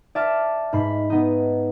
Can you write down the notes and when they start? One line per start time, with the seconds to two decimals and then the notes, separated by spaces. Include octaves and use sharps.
0.15 D5 E5 A5 D6 F6
0.73 G#2 B5 B6 C7
1.10 B3 D#4